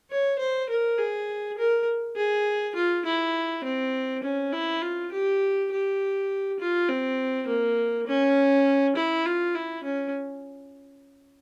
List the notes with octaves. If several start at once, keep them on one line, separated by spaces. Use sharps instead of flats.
C#5
C5
A#4
G#4
A#4
G#4
F4
E4
C4
C#4
E4
F4
G4
G4
F4
C4
A#3
C#4
E4
F4
E4
C#4